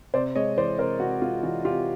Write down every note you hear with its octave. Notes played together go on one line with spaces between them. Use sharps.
C3 C5 D5
G#3 C#5 D#5
E3 C5 D5
C3 A#4 C5
C3 F#4
G#3 F4
E3 F#4
C3 F4 G4